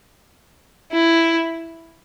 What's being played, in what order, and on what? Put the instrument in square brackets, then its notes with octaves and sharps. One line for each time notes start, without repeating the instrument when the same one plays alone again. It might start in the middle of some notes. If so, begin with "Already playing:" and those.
[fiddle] E4